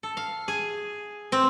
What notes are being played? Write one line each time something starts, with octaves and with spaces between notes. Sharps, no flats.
A4
F5
G#4
C4